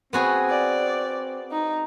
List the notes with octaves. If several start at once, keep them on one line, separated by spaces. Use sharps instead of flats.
B3 C4 F#4 G#4
D5
D#4